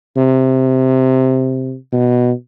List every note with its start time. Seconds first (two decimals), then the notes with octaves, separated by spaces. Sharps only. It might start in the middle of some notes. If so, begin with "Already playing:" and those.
0.17 C3
1.92 B2